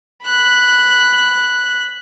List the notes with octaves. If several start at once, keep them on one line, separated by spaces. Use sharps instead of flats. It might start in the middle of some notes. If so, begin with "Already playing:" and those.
B5 F#6